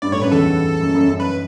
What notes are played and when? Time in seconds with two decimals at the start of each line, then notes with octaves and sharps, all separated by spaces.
0.02 G2 D5
0.12 A2 C#5
0.22 F#2 B4
0.32 E2 A4
0.81 F#2
0.94 F#2
1.07 F#2
1.20 F#2 B4